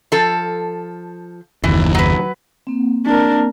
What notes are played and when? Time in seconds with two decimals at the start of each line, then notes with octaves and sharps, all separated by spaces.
0.12 F3 A4
1.64 F#1 D#2 E3
1.94 F#3 B4
2.67 A#3 C4
3.07 D4 A#4